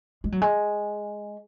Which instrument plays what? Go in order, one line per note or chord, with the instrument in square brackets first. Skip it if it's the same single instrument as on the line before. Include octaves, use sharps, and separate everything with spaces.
[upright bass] G#3
F#3
G#3